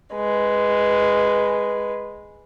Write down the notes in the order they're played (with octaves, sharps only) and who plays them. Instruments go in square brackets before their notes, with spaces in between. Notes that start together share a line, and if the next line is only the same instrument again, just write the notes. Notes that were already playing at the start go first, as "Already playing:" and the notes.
[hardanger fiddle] G#3 B4